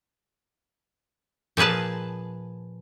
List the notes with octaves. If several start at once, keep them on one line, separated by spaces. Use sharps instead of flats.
A#2 F3 G#4 B4 A5